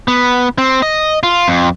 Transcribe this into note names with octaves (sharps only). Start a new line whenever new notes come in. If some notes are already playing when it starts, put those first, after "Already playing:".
B3
C4
D#5
F4
F2